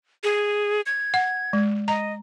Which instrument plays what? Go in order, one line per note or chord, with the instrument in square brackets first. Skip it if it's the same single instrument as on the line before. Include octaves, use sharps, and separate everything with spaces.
[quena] G#4
G#6
[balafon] F#5
G#3
[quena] D#5 [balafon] A#5